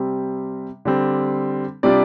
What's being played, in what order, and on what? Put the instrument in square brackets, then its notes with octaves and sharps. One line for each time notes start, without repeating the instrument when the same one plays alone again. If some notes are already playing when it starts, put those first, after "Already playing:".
Already playing: [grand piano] C3 G3 C4
D3 G3 C4
C3 G3 D4 F4 D5